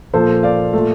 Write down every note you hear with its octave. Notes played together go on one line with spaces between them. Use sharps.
A#2 F3 A#3 A4 C5
D5 F5
A#2 A3